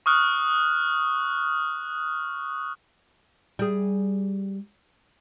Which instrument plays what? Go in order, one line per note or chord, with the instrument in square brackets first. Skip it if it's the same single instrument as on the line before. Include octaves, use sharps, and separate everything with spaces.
[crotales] C#6 D#6 F6 F#6
[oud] G3 G#4